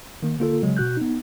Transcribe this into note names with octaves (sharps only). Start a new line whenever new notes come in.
D#3 A#3
D3 A#3 F4 A4
C#3 F#3 G#3
B2 F#4 F#6 G6
B3 D#4